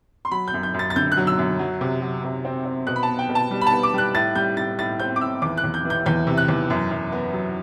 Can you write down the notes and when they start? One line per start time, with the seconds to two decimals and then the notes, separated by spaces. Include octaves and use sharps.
0.25 C6
0.31 F#3 B5
0.48 G6
0.54 F#2
0.63 G6
0.74 F#2
0.79 A6
0.90 A6
0.96 D3 G6
1.12 F#6
1.17 F#3
1.27 E6
1.38 F#2
1.59 F#3
1.81 C3
2.02 F#3
2.24 C3
2.45 C4
2.65 C4
2.87 B2 F#6
2.96 B5
3.03 A5
3.08 B3
3.19 G5
3.29 B2
3.35 A5
3.51 G3
3.61 B5
3.67 A5
3.72 B3
3.83 D6
3.94 G3 F#6
4.15 A2 A6
4.35 G3 G6
4.57 A2 A6
4.78 A2 A6
5.00 C4 G6
5.16 D6
5.21 A2 E6
5.42 E2 D6
5.57 F#6
5.64 E2
5.74 G6
5.85 E3
5.90 G6
6.06 E2 G6
6.27 C3
6.37 F#6
6.48 E2
6.70 F#2
6.91 F#2
7.12 B3
7.33 F#3